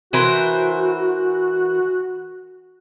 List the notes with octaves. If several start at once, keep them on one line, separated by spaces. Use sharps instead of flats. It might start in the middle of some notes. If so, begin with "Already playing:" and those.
E3 F#4 A#4 C5